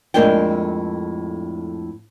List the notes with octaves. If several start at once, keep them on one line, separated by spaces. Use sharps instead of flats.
F2 A2 G#3 A#3 D4 G5